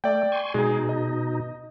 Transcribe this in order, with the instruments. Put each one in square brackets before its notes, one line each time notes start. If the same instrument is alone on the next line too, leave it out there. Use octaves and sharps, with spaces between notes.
[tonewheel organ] A3 [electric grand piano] D5 G5
[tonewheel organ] G#5 C6 C#6
[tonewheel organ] B2 D#4 [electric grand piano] G#3 G#4
[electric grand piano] D#5